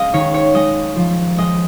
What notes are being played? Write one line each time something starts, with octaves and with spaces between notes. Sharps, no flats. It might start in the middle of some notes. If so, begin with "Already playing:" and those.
Already playing: G#3 C#4 D#5 F5
D#3 C#5
C#5
G#3 D#5
F3
G#3 D#5